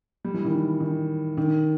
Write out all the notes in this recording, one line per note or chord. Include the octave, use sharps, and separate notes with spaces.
G3
E3
D#3
E3
D#3
D#3